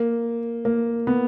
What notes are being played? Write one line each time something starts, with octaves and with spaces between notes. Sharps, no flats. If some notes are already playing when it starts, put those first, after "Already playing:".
Already playing: A#3
A#3
B3